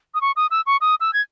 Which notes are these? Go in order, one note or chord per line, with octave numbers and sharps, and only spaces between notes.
D#6
C#6
D#6
E6
C#6
D#6
E6
G#6